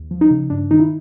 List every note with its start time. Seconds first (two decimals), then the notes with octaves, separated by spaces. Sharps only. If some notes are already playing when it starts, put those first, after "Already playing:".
Already playing: D#2
0.11 F3
0.21 D#4
0.30 C#3
0.50 G2 D4
0.71 D#3 D#4
0.80 E4